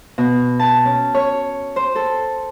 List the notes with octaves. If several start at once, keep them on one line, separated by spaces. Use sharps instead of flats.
B2
A5
C#4
C#5
C5
A4